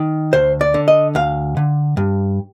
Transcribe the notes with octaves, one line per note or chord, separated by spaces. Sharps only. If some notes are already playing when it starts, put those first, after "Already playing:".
Already playing: D#3
D2 C5
D5
D3
D#5
D2 F5
D3
G2